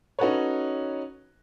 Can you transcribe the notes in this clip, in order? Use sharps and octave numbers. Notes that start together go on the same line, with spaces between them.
C#4 D#4 F#4 A4 B4 C#5